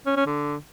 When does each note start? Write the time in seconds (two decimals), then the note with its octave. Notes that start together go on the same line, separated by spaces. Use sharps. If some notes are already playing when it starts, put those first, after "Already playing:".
0.06 C#4
0.17 C#4
0.27 D3